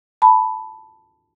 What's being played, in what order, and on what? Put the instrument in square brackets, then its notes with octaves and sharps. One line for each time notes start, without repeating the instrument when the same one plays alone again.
[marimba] A5 B5